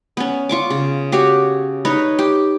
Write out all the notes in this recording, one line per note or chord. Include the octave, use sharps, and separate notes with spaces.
B3 C#4
F4 C#6 D6
C#3
F#4 G4 C#5
D#4 B4 C#5
G4